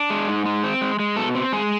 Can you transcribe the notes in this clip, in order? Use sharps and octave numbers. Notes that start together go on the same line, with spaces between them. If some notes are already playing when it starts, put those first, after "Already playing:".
Already playing: D4
G#3
G#2
G#3
C4
G#3
G#3
B2 A4
C4
G#3 G#4